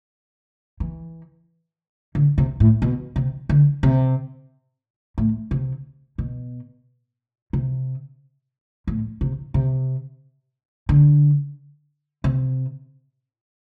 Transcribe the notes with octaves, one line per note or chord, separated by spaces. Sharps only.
E3
D3
C3
A2
B2
C3
D3
C3
A2
C3
B2
C3
A2
C3
C3
D3
C3